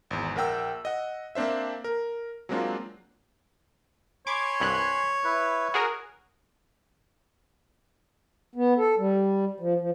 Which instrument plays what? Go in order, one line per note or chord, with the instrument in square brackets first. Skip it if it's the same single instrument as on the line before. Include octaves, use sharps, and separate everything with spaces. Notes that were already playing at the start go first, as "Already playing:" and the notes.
[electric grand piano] G#1 E2
A#1 A#4 F#5 G5 E6
D#5 F#5
A#3 C4 D4 C5 E5
A#4
F#3 G#3 A#3 C4 D4 F4
[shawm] C#5 [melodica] G#5 B5 C6 [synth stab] D6 G#6
[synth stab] C2 G2 F#6
[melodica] E4 B4
[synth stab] F#4 G#4 A#4
[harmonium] B3
A4
G3
F3
F3